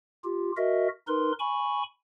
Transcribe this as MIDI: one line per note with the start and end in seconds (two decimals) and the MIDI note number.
0.24 0.52 65
0.24 0.52 67
0.57 0.88 66
0.57 0.88 70
0.57 0.88 75
0.57 0.88 76
1.08 1.32 63
1.08 1.32 70
1.08 1.32 71
1.08 1.32 84
1.39 1.83 80
1.39 1.83 83
1.39 1.83 85